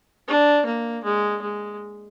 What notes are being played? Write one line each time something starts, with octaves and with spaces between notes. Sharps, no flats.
D4
A#3
G#3
G#3